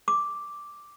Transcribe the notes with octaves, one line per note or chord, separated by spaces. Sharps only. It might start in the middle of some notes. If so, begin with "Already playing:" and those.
D6